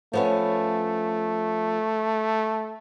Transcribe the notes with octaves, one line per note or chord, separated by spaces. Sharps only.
F3 A3 B3 C#4